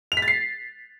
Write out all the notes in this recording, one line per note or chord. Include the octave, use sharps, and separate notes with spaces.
F7
B6
A6
C7